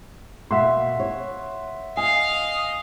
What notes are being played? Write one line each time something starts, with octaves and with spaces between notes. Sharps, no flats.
B2 A#3 E5 F#5 C6
C#5
D#5 F5 G#5